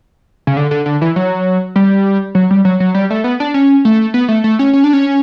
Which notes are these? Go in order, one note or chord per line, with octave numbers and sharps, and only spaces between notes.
C#3
D3
D3
D3
E3
F#3
G3
F#3
G3
F#3
F#3
G3
A3
B3
D4
C#4
A3
B3
A3
A3
C#4
C#4
D4
C#4